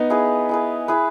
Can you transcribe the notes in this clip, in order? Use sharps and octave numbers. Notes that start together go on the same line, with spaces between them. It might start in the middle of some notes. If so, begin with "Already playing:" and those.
Already playing: B3 D#4
E4 G#4 B4
E4 G#4 B4
E4 G#4 B4